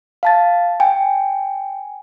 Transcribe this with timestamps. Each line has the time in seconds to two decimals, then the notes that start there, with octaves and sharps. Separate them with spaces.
0.23 F5 A5 A6
0.80 G5 G#5